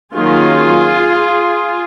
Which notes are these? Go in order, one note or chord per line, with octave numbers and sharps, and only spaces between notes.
D#3 F#3 A#3 C#4 F4 G#4